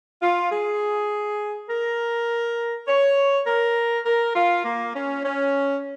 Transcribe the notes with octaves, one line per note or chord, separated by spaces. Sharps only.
F4
G#4
A#4
C#5
A#4
A#4
F4
A#3
C#4
C#4